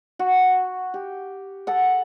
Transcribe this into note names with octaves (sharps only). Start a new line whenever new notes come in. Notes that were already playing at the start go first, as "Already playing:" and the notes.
F#4
G4
A4 F#5